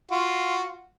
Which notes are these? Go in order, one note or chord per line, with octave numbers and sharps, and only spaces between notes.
F4 F#4